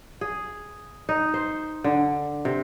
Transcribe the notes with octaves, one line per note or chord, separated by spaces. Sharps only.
G#4
D#4
C5
D3
C3